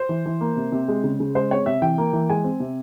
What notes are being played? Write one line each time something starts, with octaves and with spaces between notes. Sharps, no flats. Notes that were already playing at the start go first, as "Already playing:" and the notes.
Already playing: C5
E3
E3
A#3
C3
C3
G#3
C#3
C#3
G#3 C5
C4 C#5
C3 E5
E3 G5
A#3
E3
G#3 G#5
C4
C3